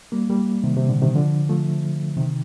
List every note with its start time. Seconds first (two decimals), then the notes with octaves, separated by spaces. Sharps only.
0.12 G3 A#3
0.29 G3 A#3
0.64 C3 D#3
0.76 C3
0.89 A#2 D3
1.02 C3 D#3
1.15 D3 F3
1.49 F3 A3
2.17 C3 D#3